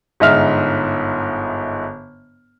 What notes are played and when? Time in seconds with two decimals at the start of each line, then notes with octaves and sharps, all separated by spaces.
0.20 G1 G#2 D#5 E5 F6